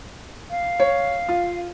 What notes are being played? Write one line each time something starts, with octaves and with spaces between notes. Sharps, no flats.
F5
C#5
F4